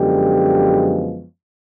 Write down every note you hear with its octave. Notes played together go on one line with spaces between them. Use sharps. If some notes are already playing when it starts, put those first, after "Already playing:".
Already playing: F#2 D3 F3 G#3 B3 G4